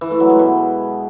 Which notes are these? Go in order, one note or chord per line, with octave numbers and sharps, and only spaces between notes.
E3
A3
F#3
G#3
B2